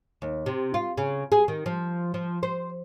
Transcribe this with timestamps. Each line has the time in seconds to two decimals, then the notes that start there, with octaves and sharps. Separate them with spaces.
0.22 D#2
0.46 C3
0.74 F4
0.98 C#3
1.32 G#4
1.48 D#3
1.66 F3
2.14 F3
2.43 C5